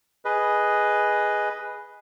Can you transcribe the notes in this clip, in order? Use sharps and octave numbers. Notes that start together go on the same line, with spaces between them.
G#4 B4 D#5